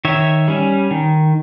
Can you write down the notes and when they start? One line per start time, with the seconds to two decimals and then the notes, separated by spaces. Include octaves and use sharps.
0.05 D#3 C#5 E5
0.48 G3 C#4
0.91 D#3